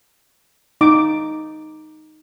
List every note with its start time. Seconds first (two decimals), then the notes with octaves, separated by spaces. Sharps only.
0.81 D#4 D6